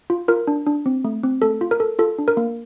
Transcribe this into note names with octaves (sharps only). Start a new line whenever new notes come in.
F4
F4 A#4
D4
D4
C4
A3
C4
A3 A4
F4
A#4
A4
F4 A4
D4
A#4
A#3